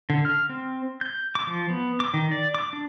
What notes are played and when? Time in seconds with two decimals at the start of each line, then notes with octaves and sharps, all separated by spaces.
0.10 D3
0.25 F6
0.49 C4
1.01 G6
1.35 D6
1.47 F3
1.70 B3
2.00 D6
2.14 D#3
2.31 D5
2.54 D6
2.73 D4